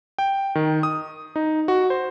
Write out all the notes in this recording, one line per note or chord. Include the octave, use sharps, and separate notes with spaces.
G5
D#3
D#6
D#4
F#4
C5